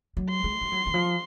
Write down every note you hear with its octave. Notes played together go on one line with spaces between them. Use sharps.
F#3
C6
G#3
G#3
F#3
D#3
F3